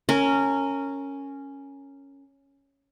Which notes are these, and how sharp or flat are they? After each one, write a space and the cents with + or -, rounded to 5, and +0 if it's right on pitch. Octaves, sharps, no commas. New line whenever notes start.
C#4 +0 A#4 -20